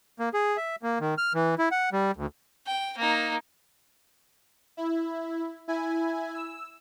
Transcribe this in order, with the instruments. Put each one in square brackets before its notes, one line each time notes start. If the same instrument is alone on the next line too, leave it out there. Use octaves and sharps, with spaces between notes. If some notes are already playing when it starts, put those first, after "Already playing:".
[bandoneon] A#3
G#4
E5
A#3
D#3
F6
E3
E4
F#5
G3
D2
[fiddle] G5
A#3 D#4
[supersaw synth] E4
E4 G#5
E6